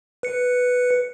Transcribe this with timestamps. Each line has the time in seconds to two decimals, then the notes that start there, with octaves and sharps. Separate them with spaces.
0.23 B4 C#7